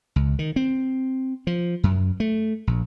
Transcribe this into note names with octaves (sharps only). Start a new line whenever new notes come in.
C#2
D#3
C4
F3
F#2
A3
A#1